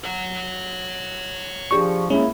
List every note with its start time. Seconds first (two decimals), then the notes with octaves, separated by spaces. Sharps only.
0.05 C#5 F#5
1.71 F3 D4 G4 G#4 C#6
2.10 G#3 A#3 C#4 E4